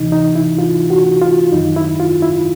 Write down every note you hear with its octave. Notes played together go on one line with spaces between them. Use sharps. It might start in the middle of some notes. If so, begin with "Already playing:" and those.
Already playing: D2 C3 E3 D#4
D#4
E4
F4
F#4
F4
F#2 D#3 D#4
E4
F4
E4